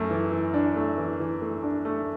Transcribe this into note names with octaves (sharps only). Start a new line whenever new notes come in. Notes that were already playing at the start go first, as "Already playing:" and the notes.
Already playing: F#2 A3
E3
E3
D4
A3
E3
E3
A3
D4
A3